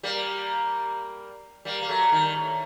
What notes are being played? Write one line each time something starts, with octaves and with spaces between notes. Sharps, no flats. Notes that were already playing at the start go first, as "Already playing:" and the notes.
G3 A#3
G3 A#3
A#3
F#3 A3
D#3 G3
A2